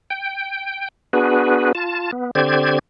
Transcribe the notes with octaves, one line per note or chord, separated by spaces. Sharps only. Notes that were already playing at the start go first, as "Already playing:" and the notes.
G5
B3 D4 F#4 G#4 B4
F4 A5
B3
D3 C4 G4 C5 D5 G#6